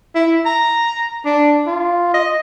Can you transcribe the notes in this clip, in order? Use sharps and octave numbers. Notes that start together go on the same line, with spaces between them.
E4
A#5
D4
F4
D#5